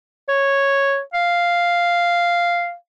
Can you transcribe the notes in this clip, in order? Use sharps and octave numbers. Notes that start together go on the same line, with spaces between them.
C#5
F5